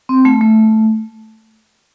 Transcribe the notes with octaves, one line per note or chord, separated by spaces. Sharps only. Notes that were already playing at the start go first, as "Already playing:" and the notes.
C4
A3
A3